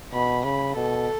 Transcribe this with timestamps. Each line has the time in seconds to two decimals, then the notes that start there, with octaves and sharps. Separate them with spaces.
0.13 B2 B5
0.45 C#3 B5
0.76 B2 A4